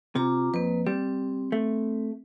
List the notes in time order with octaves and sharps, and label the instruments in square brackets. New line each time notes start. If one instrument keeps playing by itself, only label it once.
[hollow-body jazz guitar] C3 [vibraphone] F4 A#5 D6
[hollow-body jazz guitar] F2 [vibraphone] A#3 B4
[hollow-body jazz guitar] G3 [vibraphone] C4
[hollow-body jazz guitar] A3